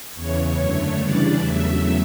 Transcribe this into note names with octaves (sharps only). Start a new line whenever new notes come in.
E2 C#3 E3 C#5
F#2 D3 A3
C#3 E3 G3 D4 D5
E2 C#3 F#3 A3 E5